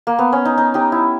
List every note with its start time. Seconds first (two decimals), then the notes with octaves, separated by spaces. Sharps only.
0.07 A#3
0.19 B3
0.33 C#4
0.45 D#4
0.58 D#4
0.74 D#4 G4
0.92 E4